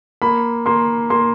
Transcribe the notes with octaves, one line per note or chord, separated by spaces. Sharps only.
A#3 B5
A#3 C6
A#3 C6